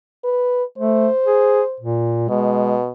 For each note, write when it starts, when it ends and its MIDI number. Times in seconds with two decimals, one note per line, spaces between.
0.24 0.64 71
0.78 1.08 57
0.78 1.81 72
1.26 1.62 68
1.80 2.27 46
2.29 2.93 47
2.29 2.77 56